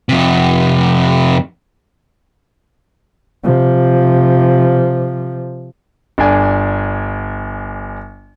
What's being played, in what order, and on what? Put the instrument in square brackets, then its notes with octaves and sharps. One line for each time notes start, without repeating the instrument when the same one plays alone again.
[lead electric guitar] F2 C3
[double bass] C3 F3
[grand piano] G1 D4 G#5